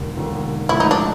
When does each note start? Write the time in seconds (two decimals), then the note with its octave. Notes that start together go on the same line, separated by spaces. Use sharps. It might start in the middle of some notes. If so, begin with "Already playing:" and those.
Already playing: E1 D#2 D3
0.17 E1 D#2 D3
0.69 A2 F3 G#3 E4
0.80 D#4
0.91 D4